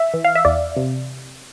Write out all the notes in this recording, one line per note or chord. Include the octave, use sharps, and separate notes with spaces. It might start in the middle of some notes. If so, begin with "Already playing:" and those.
Already playing: E5
E3
F5
E5
E2 D5
C3